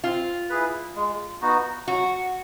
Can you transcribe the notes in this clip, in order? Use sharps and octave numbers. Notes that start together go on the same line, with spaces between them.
C4 F4
E4 G#4 B4
G#3
B3 D#4 F#4
F#3 F#4